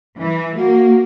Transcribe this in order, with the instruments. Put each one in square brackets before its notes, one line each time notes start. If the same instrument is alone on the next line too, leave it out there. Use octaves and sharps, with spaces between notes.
[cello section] E3
[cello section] A#3 [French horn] F#4